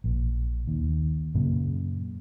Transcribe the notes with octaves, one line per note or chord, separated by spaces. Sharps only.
A#1
D#2
F#2 A#2 C#3